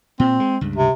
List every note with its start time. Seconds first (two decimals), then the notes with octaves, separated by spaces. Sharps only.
0.20 A#2 C4
0.40 G#3
0.61 C#2 G2
0.76 C3